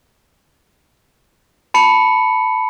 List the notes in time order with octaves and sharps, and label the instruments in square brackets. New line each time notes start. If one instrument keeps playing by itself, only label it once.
[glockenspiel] A5 B5 C#7